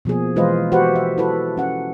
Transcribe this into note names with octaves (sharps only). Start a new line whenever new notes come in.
B2 F3 A#3 G#4
E3 G#3 F4 B4 C5 D#5
F#4 G4 B4 C5 F#5
E5
E4 F#4 A4 B4
C#4 F#5